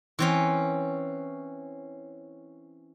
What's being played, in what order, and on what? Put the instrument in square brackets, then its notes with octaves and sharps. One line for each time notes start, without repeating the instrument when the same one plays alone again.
[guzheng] E3 C4 C#4